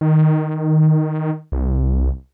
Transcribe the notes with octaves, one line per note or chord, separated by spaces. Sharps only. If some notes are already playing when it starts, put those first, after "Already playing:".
D#3
C2